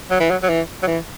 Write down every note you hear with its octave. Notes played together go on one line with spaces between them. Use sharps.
F#3
E3
F#3
F#3
E3
F#3
E3